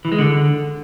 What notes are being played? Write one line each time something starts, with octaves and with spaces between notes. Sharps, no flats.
E3
G#3
D3